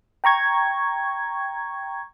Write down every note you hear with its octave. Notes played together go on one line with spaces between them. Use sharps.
G5 A#5 C#6 G#6